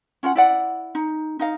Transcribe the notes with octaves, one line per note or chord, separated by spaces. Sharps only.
C#4 F4 A4 F#5
E4 D5 F#5
D#4
D#4 D#5 F5